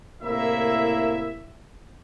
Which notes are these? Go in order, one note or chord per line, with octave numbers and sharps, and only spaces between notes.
C2 A2 A#3 E4 E5